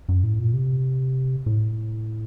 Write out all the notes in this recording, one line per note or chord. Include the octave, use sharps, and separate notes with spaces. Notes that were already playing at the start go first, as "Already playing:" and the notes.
F#2
A2
A#2
C3
A2